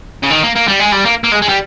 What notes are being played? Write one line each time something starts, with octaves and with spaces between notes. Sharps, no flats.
C#3
D#3
A#3
A#3
G3
G#3
G3
A#3
A#3
G#3
G#3
G3